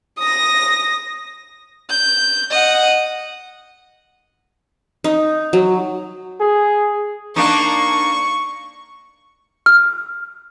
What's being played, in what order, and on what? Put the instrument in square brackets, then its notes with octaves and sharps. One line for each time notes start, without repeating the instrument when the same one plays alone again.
[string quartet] D#6 A#6
[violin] G6
D#5 F#5
[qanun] D#4
F#3
[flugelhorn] G#4
[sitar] A#3 D4 D#4 [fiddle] C#6
[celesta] F6